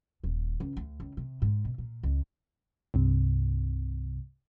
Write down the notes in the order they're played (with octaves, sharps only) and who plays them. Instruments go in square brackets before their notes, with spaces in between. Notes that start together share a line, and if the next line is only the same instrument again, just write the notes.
[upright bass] D#1
C#2
D2
C#2
C3
G#2
B2
A#2
C#2
[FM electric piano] C2 G2 C3